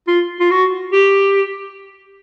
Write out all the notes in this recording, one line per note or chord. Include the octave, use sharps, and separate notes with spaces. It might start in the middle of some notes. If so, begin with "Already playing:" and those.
F4
F4
F#4
G4